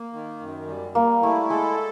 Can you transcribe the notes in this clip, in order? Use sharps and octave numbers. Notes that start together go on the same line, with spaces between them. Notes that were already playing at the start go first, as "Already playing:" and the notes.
Already playing: A#3
D#3
F#2
G3
G3 A#3
A3 E4
G#3 A4